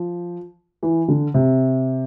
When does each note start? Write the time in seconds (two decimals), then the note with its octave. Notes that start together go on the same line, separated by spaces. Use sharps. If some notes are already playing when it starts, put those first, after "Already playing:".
Already playing: F3
0.83 E3
1.08 D3
1.34 C3